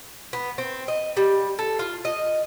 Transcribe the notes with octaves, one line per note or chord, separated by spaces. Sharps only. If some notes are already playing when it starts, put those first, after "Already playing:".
B3
C4
D#5
G3
A4
F4
D#5